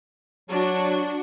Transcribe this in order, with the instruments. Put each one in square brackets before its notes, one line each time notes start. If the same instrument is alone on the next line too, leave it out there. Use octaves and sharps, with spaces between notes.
[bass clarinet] F#3 [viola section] D4 F#4